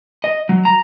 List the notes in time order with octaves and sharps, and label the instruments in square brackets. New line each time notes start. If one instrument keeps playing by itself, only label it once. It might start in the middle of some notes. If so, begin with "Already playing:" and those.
[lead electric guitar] D#5
F#3
A#5